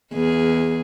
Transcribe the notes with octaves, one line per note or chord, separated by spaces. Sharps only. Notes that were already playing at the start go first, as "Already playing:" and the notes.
E2 G#4